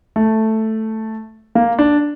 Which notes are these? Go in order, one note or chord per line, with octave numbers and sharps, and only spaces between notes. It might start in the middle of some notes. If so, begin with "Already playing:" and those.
A3
A#3
D4